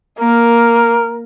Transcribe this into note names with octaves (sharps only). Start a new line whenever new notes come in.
A#3 A#4